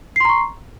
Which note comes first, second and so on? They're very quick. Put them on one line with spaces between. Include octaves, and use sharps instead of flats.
C7 C6 A#5 C#6